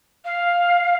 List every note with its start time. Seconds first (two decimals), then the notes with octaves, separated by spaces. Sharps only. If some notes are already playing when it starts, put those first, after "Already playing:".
0.25 F5